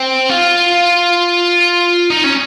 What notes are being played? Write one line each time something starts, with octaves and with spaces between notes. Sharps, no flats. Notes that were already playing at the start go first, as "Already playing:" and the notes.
Already playing: C4
F4
D#4
C#4